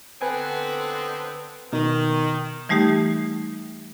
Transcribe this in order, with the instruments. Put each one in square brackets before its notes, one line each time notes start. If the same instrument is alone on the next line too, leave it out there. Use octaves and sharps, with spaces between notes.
[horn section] D3 B3 C4 [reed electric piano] B4 G#5
[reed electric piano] B2 D#4 [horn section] D#3
[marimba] E3 G3 A3 D#4 G4